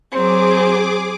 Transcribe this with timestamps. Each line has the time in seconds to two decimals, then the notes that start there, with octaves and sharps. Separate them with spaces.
0.12 F#3 C4 G#4 D6